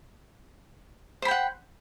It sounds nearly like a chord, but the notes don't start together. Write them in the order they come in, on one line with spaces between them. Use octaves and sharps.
C5 B5 G5 F#5